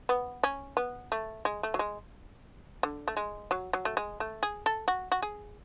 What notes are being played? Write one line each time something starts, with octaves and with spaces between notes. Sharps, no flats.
B3
C#4
B3
A3
G#3
A3
F#3
G#3
D3
A3
G#3
F#3
F#3
A3
G#3
A3
G#4
A4
F#4
F#4
G#4